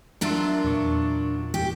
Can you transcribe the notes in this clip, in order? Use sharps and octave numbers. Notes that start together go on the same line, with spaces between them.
F#3 D4 F4 A#4 E5 C6
E2 A#2 C#6
G4